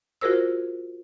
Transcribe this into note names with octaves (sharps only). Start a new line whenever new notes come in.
F4 F#4 G#4 A#4 C5 E6